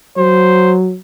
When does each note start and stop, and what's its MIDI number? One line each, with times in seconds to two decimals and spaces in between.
0.18 0.97 54
0.18 0.75 72